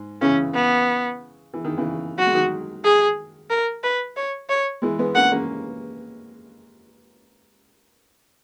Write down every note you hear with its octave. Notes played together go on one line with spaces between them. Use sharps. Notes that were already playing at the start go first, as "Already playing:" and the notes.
Already playing: G#2
C#3 E3 C#4
B3
E3
D#3
C#3 E3
F#3 F#4
G#3
D#3 F#3
G#4
A#4
B4
C#5
C#5
E3 G#3
G#3 B3
A#3 C#4 F#5
A#3 C#4